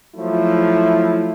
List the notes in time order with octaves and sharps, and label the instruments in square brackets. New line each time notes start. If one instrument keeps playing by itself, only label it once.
[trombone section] F3 F#3 A3 E4